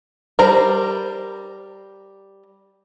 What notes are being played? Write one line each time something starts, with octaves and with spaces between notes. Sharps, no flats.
G3 A#4 C5 A#5